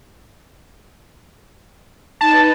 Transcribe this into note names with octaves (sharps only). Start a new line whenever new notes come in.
D#4 B4 A5